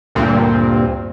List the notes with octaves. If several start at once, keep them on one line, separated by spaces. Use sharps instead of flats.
D2 G2 A#2 C4